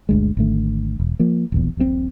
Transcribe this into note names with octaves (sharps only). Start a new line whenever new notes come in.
G1 D2 G#3
G#1 D3 A3
E1
F3 A#3
D#1 A#1 E2
D#1 A#1 G#2 C4